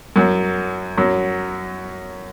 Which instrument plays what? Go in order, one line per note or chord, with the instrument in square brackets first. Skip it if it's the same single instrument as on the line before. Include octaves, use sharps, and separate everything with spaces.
[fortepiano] F#2 F#3
F#2 F#3